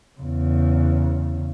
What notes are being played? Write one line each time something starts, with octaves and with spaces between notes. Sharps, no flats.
E2 C#3